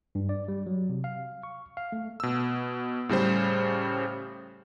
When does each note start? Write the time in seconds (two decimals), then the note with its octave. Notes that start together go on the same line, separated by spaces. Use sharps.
0.15 G2
0.29 D5
0.48 G3
0.66 F#3
0.89 C3
1.04 F5
1.43 C#6
1.77 F5
1.92 A3
2.20 B2 E6
3.09 A2 C#3 G3 C5